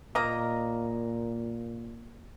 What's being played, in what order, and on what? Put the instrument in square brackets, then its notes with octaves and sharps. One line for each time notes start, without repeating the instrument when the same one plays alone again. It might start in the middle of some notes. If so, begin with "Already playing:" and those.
[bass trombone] A#2 [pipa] A#3 D#5 A#5